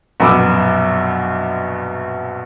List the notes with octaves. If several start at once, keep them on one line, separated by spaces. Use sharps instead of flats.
A#1 F#2 B2 B5 D6 E6